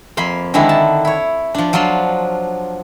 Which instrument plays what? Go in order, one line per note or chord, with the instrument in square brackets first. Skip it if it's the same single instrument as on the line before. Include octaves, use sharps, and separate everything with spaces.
[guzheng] F2 A#3 B5 C6
D3 D#3 G#3 D4 E4
A5
E4 C#5
F3 D4
F3 F#3 D4 F4 C6